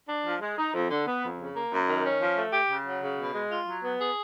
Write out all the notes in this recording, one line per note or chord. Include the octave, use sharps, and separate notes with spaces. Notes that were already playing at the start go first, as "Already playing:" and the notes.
D4
F3
G#3
D#4
F2
D3
B3
F2
C#3
A#3
F#2
D#3
C#4
F3
A3
G4
C#3
F#3
C#3
B2
G#3
F4
F#3
B3
G#4